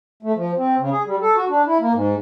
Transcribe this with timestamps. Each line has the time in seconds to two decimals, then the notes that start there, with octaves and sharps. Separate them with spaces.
0.23 A3
0.35 F3
0.58 C4
0.79 C#3
0.92 G#4
1.06 G3
1.22 A4
1.36 F#4
1.49 D4
1.67 E4
1.80 A#3
1.94 G#2